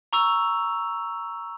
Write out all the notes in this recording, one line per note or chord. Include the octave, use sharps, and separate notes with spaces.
A#5 C#6 E6 F7